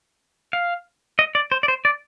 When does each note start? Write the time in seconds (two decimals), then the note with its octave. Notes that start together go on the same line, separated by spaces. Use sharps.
0.53 F5
1.19 D#5
1.35 D5
1.52 C5
1.63 D5
1.68 C5
1.85 D5